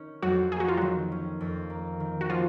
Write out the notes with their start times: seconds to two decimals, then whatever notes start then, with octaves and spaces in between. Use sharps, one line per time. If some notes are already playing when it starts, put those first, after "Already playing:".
Already playing: D#3 C#4
0.22 F2 F#3 F#4
0.52 A#3 G#4
0.60 F#4
0.68 F4
0.77 D#3 F#3 F#4
1.12 C#4
1.41 F2
1.70 A#3
2.00 D#3
2.21 F#4
2.30 F3 C#4 F4